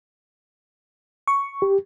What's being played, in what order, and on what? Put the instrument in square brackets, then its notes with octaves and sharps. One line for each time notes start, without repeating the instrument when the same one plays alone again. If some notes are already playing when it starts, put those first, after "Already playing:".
[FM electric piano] C#6
[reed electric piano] G4